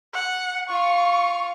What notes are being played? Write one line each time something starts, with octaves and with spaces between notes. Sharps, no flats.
F#5
F4 F5 C#6